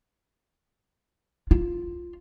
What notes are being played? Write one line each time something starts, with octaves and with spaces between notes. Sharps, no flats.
F4